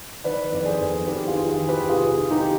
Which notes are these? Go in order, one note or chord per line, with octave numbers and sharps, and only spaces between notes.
D#3 B4 D5
F2 D5
G#4 C5
F2
D#3 G4 B4
F4 G#4
D#3
F4 G#4
D#3
G4 B4
C3 F4 G#4
D#3
D#4 G4